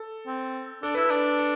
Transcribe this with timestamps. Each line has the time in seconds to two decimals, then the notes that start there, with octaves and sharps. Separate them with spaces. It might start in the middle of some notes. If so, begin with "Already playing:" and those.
Already playing: A4
0.27 C4
0.83 D4 A4
0.95 E4 B4
1.05 A4
1.10 D4
1.39 A4